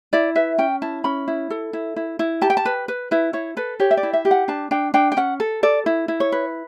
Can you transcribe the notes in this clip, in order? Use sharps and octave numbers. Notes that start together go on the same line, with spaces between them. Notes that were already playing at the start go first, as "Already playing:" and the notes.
E4 D5
B4 E5
C#4 G5
E4 A5
C#4 B5
E4
A4
E4
E4
E4
G4 A5
G5
A5
B4
B4
E4 B4
E4 C#5
A4 B4
G4 C#5
E5
D5
E4
E5
G4
F#5
D4 A5
D4 G5
D4 G5
G5
C#4 F#5
A4
A4 D5
E4
E4
C#5
B4